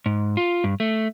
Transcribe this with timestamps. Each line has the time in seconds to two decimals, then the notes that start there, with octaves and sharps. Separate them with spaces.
0.06 G#2
0.37 F4
0.64 G2
0.80 A3